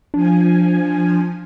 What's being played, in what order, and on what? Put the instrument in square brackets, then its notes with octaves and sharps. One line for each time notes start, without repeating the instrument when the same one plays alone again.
[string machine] F3 G#5 [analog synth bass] D4